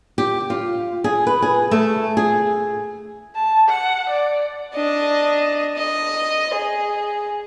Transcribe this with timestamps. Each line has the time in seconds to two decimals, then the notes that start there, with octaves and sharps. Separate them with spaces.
0.18 G4
0.50 F4
1.04 G#4
1.27 B4
1.42 G#4
1.71 A3
2.17 G#4
3.35 A5
3.69 F#5
4.09 D5
4.74 D4 D#5
5.77 D#5
6.54 G#4